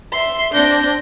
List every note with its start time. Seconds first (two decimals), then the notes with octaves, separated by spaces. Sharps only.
0.13 E5 C6
0.53 C4 D4 G6 A#6